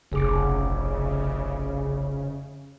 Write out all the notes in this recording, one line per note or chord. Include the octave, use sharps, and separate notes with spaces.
F1 A#1 C#3 G#4 D6